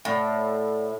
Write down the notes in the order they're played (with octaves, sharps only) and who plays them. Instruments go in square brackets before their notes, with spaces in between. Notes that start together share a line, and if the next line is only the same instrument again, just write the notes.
[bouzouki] A2 [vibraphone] A4 D5 F#5